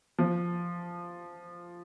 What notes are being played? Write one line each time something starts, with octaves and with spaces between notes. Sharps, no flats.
F3